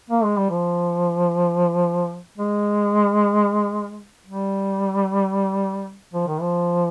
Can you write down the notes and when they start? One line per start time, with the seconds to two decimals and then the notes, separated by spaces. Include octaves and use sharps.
0.10 A#3
0.24 G#3
0.37 G3
0.50 F3
2.38 G#3
4.26 G3
6.14 F3
6.28 D#3
6.41 F3